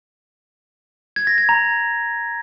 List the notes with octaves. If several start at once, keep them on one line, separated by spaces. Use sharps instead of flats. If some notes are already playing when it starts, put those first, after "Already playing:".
G#6
A#6
G#6
A#5